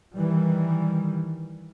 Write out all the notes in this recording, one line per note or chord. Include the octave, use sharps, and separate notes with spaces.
D#3 E3 G3